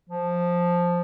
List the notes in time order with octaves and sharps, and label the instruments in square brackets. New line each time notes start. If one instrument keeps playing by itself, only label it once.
[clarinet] F3